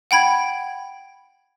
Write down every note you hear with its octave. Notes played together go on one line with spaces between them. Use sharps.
F#5 G5 B5 G#6